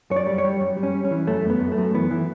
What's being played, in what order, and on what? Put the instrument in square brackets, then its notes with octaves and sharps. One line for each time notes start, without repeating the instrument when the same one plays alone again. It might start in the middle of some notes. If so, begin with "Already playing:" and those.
[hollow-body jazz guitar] F#2 C#5
D5
G3
C#5
G3
F#2
G3
C#4
G3
C#4
E3
F#2 A3
F#2
B3
F#2
A3
F#2
E3 B3
E3